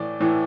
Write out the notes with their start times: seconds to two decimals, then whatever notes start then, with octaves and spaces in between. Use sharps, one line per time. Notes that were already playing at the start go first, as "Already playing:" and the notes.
Already playing: A2 E3 D5
0.20 A2 E3